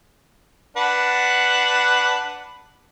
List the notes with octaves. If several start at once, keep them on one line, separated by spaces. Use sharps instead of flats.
D4 B4 F#5